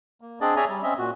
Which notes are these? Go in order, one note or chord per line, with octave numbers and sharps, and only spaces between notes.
A#3
C4 D4 G#4 D5 D#5
G#4 C#5 D5 E5 G#5 A#5
G3
C4 C#4 D#5 E5
A#2 F#4